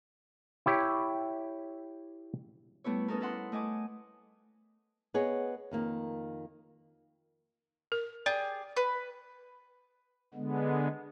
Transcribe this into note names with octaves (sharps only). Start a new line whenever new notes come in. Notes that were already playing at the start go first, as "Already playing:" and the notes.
E4 G4 C#5
G3 A3 B3 E4 C#5
B3 C#4 D#4 A4 A#4
D#4 E4 A4 F#5 C6
A3 D#5 G#5 D6
B3 G#4 C#5 D#5
F2 D#3 A#3
A#4
G4 G#4 D5
B4
D3 G#3 B3